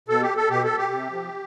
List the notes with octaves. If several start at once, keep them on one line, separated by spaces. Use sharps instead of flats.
B2 A4
G4
A4
B2 G4
A4
G4
C3
F3